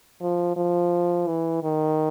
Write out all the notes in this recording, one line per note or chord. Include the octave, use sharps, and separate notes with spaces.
F3
F3
E3
D#3